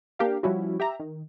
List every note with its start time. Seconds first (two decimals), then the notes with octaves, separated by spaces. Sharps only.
0.19 A#3 D4 G4 A#4 F5
0.43 F3 G3 C#4 E4 F#4
0.80 G4 E5 A#5
1.00 D#3